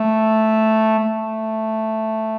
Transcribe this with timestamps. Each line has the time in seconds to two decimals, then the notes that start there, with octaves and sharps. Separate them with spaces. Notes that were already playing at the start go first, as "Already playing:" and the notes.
Already playing: A3
0.99 A3